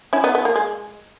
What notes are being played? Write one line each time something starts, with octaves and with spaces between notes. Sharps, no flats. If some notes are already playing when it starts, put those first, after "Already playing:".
C#4 E4
B3 D#4
B3
A#3
G#3